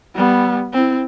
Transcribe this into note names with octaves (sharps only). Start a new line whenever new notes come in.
G3 B3
C4 E4